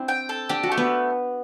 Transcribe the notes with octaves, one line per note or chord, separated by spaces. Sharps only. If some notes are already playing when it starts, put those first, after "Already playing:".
Already playing: C4 D4 E4
G5
A4
D4 G4
F#4
A3
B3